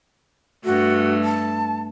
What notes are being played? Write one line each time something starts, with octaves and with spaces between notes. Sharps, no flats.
G2 A3 F#4
A5